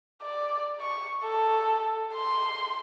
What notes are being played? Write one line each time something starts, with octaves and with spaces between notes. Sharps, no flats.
D5
C#6
A4
C6